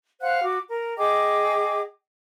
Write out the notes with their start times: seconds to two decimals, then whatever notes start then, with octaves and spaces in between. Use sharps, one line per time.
0.21 C5 F5 F#5 F#6
0.44 F#4 D6
0.69 A#4
0.98 G#4 D#5 G5 D6